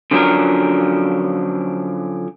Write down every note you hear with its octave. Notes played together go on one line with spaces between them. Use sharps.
D3 F3 F#3 C#4 D4 A#4